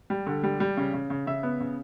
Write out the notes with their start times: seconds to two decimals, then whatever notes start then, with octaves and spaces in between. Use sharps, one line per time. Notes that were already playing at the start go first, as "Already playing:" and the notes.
0.10 G3
0.27 D3
0.44 G3
0.60 G3
0.77 C#3
0.93 C#3
1.10 C#3
1.27 C#3 E5
1.43 B3
1.60 C#3